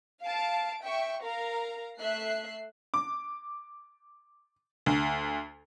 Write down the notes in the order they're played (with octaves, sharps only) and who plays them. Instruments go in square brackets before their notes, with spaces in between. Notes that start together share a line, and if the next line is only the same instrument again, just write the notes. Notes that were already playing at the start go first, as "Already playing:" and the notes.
[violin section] F5 A5 D7
E5 G5 C#6
A#4 F5 A#5
A3 E5 F#6 C7
[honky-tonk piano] D6
D2